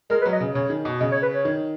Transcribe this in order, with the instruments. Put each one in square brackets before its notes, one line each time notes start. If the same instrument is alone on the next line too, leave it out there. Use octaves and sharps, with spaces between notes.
[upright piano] G#3 [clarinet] A#4
[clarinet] B4
[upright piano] F#3
[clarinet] D#5
[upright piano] C#3
[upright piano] C#3 [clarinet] C#5
[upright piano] D#3
B2
[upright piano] C#3 [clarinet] D#5
[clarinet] C#5
B4
C#5
[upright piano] D#3